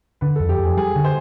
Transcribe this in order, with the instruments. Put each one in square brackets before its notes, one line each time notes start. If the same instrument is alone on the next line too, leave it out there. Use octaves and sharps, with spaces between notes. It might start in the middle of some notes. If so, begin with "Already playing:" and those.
[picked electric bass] D3 [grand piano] B4
[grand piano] A4
[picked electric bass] F2
[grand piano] G4
[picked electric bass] F2 [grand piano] G#4
[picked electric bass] G3 [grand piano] G#4
[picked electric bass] D3
[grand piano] C5